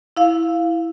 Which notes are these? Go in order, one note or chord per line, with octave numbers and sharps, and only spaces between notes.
E4 F5